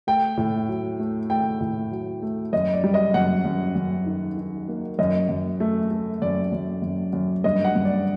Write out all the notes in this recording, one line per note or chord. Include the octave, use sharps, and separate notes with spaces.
A3 G5
A2
F#3
A3
A3 G5
A2
F#3
A3
F#2 D#5
D5
G3
D#5
F#2 F#5
F#2
F#2
D#3
D#3
A#3
F#2 D#5
F#2
A3
A3
F#2 D5
F#2
F#2
F#2
G2 D#5
F#5
G2
D5